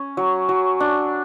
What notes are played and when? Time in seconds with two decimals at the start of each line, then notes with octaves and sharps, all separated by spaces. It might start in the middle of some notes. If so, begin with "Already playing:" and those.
Already playing: C#4
0.17 F#3
0.49 F#3
0.80 D4